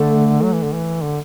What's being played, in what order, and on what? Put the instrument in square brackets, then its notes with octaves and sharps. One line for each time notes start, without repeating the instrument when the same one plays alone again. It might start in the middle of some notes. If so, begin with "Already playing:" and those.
Already playing: [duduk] D3 [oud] A3
[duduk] F#3
E3
D3
E3
D3